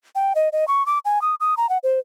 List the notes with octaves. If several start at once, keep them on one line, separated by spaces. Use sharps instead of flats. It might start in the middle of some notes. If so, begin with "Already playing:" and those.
G5
D#5
D#5
C#6
D6
G#5
D#6
D#6
A#5
F#5
C5